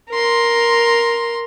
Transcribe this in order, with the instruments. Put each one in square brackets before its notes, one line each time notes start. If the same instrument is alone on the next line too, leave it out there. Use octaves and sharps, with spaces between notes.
[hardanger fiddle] A#4 C6